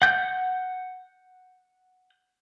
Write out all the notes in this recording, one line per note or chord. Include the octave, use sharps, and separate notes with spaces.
F#5 G6